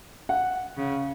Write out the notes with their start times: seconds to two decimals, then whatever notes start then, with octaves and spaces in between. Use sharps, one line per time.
0.29 F#5
0.77 C#3